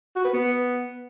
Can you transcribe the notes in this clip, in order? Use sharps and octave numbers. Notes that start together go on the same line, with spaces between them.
F#4
B4
B3